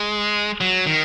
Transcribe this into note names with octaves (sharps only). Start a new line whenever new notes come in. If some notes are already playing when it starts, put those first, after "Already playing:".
Already playing: G#3
F#3
D#3